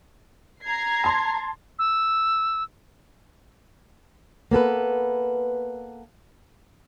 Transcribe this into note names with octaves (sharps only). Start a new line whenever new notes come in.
A#5 G#6 C7
A5 C6
E6
A#3 B3 A4 B4